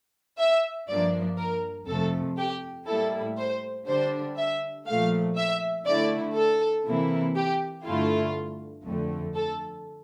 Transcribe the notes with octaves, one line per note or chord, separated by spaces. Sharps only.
E5
G2 F3 A#3 D4 D5
A#4
F2 C3 F3 A3 A4
G4
A2 G3 A#3 E4 A4
C5
D3 G3 D4 C5
E5
A#2 F3 A3 F5
E5
D3 A3 E4 D5
A4
C3 E3 A#3 E4
G4
G2 D3 A3 E4 F4
F2 D3 A3
A4